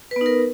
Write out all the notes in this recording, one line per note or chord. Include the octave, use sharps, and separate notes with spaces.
B3 D#4 A#4 B4